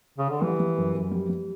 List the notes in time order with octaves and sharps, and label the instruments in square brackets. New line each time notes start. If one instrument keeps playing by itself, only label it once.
[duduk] C#3
D3
[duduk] E3 [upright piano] G3
[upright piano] G3
F#2
F#2
G3
G3